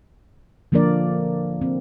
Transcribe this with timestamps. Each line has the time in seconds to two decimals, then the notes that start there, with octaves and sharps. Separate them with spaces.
0.72 D3 F3 A#3 D4 A#4 D5
1.61 C4